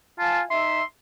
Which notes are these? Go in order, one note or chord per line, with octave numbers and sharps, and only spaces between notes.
F4 F5 G#5 A5
D#4 E5 C6